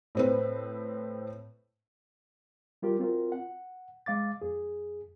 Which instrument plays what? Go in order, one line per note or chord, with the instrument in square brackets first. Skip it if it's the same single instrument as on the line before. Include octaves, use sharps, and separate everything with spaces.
[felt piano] A2 C4 B4
[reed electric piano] G3 F4 G4 A#4
C4 F4 F#4 A#4
F#5
G#3 F5 D6 A6
F2 G#4